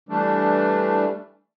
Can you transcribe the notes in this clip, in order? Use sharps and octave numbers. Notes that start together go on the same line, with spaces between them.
E3 G3 A3 D4